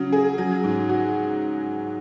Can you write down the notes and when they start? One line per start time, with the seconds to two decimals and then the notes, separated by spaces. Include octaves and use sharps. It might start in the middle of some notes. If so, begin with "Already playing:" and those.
Already playing: C#3 F#3
0.13 G#4
0.38 F#3
0.64 G#2
0.89 F#4